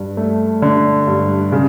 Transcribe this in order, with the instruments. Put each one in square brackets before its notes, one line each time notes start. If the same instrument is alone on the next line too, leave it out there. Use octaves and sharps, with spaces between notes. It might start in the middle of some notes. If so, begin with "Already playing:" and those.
Already playing: [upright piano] G2
A3
D3
G2
C#3